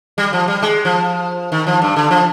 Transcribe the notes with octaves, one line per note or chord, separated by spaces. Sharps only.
G3
F3
G3
G#3
F3
D#3
F3
G2
D3
F3